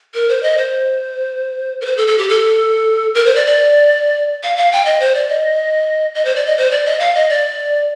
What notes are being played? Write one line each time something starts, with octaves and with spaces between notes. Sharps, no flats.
A#4
C5
D#5
C5
A#4
C5
A4
A4
G4
A4
A#4
C5
D5
D5
F5
F5
G5
D#5
C5
D5
D#5
D#5
C5
D5
D#5
C5
D5
D#5
F5
D#5
D5